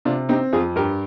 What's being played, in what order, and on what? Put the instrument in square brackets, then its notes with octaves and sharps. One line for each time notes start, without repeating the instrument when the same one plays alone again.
[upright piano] C3 [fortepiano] D4 F4
[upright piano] C4 [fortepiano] D#4 G4
[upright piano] F2 [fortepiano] F4 G#4
[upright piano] G2 [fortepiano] G4 A#4